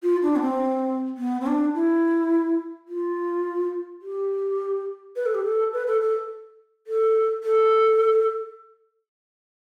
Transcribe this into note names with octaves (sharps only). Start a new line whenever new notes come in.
F4
D4
B3
C4
B3
C4
D4
E4
F4
G4
B4
A4
G4
A4
B4
A4
A4
A4
A4